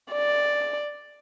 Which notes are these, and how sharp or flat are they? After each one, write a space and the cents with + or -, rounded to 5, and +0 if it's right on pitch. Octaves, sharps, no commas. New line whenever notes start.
D5 +5